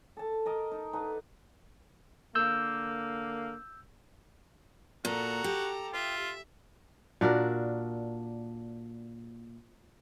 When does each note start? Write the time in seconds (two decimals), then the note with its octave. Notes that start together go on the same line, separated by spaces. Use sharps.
0.17 A4 A5
0.46 A#4 D#5 A5
0.72 D#4
0.93 D3 D#4 B4 A5
2.35 D3 A#3 E6 G6
5.05 A#2 F#4 A4 A#5
5.44 G4
5.94 F4 E5
7.21 A#2 D4 F#4 A#4